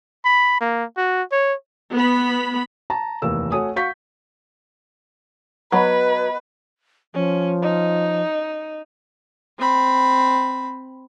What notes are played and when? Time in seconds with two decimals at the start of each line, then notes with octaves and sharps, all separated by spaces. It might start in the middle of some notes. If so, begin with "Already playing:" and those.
0.25 B5
0.61 A#3
0.97 F#4
1.32 C#5
1.93 B3 B5
2.90 A5 A#5
3.22 F1 D#2 E3 A#4 E6
3.52 A3 F#4 C#5 G#5 D#6
3.76 F#4 F5 C#6 G6 B6
5.72 F#3 B3 B4 D#5
7.14 F3 C#4
7.62 D#4
9.58 C4 B5